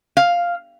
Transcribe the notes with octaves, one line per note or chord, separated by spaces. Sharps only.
F5